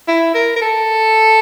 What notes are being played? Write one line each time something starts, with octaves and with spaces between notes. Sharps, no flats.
E4
A#4
A#4
A4